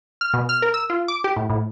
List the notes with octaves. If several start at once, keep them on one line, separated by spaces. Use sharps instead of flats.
F6
B2
F6
A#4
E6
F4
D6
G4
A2
A2